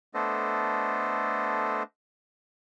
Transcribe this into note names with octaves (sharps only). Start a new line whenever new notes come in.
A3 B3 D4 A4 C5 D#5